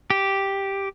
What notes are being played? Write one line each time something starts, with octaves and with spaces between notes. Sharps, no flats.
G4